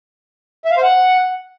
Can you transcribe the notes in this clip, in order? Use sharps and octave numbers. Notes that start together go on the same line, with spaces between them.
E5
F5
C5
F#5